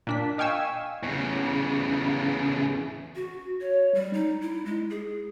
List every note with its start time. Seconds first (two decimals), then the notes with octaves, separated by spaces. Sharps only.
0.07 A#2 D4 B6
0.38 D#5 F5 G5 G#5 C#6 E6
1.03 E2 C#3
3.16 F#4
3.61 C#5
3.94 G3
4.13 D#4
4.41 E4
4.65 G#3
4.90 G#4